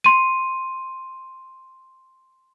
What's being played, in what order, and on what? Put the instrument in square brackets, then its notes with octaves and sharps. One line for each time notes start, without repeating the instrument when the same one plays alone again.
[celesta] C6 D#7